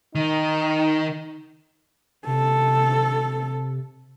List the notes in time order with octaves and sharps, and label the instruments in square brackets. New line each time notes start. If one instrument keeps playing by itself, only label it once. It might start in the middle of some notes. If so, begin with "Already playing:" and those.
[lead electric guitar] D#3 [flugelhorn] D#4
[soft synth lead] C3 [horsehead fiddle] A4